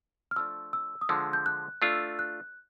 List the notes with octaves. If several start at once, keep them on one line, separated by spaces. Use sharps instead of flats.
F6
F3 A3 D4 E6
E6
D#6
D3 F3 G#3 E6
G6
F#6
A3 D4 F4 E6
F#6